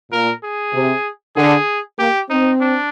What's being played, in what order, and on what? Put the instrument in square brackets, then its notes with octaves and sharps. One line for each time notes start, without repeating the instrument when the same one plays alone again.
[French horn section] A#2 [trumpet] A#4
[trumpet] G#4
[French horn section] C3
[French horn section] D3 [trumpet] G#4
[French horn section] A#3 [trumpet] G4
[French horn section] C4 [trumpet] D#4
[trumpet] D4